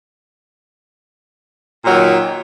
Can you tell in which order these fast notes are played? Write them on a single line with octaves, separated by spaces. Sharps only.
A#2 F#3 D#3